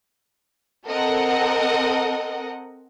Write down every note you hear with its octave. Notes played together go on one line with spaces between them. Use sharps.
C4 A4 A#4 D#5 F#5